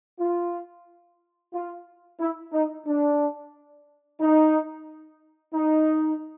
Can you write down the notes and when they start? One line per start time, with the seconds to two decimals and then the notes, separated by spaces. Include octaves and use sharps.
0.20 F4
1.53 F4
2.20 E4
2.53 D#4
2.87 D4
4.20 D#4
5.53 D#4